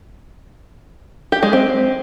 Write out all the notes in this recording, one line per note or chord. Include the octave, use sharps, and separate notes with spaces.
G4
G#3
C4